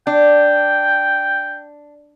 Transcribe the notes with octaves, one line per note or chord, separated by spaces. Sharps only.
D4 G5